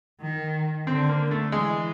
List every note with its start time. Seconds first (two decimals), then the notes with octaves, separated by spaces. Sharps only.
0.21 D#3
0.87 D3 C4
1.09 A#3
1.31 A3
1.52 E3 G#3